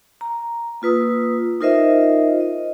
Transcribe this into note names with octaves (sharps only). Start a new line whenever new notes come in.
A#5
A#3 F4 B4 D#6 E6
D#4 F4 A#4 C5 D#5 E5
D#5